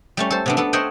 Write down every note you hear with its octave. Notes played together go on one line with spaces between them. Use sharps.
G3 A3 C#4
A4 C5
C3 B3 D4
B3 D4 A4
C5 C#5 D#5 E5 F#5 G5